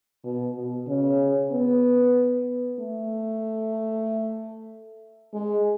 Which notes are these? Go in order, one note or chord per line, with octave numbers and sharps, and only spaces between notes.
B2
B2
C#3
B3
A3
G#3